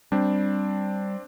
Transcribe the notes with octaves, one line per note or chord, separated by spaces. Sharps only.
G3 C4 D4